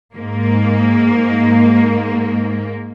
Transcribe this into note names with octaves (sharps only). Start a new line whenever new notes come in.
G#2 A#3